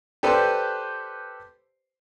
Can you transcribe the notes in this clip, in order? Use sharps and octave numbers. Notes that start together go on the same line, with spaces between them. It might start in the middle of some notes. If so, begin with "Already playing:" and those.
G4 A4 B4 C5 D5